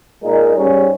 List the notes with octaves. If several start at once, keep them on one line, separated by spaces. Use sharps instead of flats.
A#2 G#3 D#4 A#4
G#2 G3 C#4